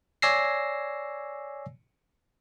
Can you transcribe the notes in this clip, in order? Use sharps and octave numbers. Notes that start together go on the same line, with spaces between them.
C#5 D5 G#5 E6 A#6 C7